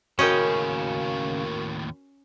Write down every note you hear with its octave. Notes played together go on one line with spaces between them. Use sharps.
D#2 A2 C#3 C#4 F#4 A#4 D#5 G5